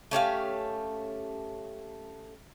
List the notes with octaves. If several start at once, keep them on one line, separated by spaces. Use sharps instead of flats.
A3 C#4 G4 F5